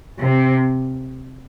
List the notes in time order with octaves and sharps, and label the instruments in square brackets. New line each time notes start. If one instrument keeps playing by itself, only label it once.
[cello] C3